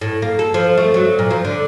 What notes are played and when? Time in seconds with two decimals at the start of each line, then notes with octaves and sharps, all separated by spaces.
0.01 A2
0.22 A#3
0.39 A4
0.54 F3
0.77 A3
0.94 F#3
1.19 A#2
1.31 F3
1.45 D3